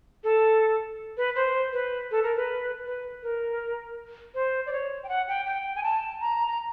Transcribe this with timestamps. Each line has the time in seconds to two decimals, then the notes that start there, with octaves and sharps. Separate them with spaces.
0.24 A4
1.17 B4
1.36 C5
1.73 B4
2.11 A4
2.23 A#4
2.36 B4
2.86 B4
3.23 A#4
4.35 C5
4.66 D5
4.73 C#5
5.03 G5
5.09 F#5
5.28 G5
5.46 G5
5.76 G#5
5.83 A5
6.21 A#5
6.47 A#5